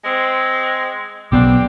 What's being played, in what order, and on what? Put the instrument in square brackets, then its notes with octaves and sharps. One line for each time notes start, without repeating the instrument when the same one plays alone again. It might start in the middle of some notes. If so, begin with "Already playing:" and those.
[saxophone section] G#3 C4
[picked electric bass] B1 B3 [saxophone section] C4 D4 G4